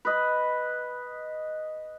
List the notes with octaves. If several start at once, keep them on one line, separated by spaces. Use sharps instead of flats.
B4 D#5